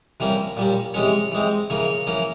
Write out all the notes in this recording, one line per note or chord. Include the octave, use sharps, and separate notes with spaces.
C3 E3 G3 A#3 C#4
A#2 G3 C#4
C3 E3 G#3 C#4 C#5
E3 G#3 C4
C#3 E3 A#3 C#5
E3 A#3 C#4